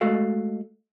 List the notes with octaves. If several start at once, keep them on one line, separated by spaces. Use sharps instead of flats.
G#3 A3 F#4 A4 F5